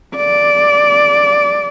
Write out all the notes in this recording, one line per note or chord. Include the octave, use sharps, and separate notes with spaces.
D5